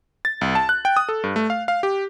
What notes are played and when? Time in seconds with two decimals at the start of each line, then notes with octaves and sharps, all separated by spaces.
0.25 A6
0.41 C2
0.55 A5
0.69 F#6
0.85 G5
0.97 D#6
1.09 A4
1.24 G2
1.36 A3
1.50 F5
1.68 F5
1.83 G4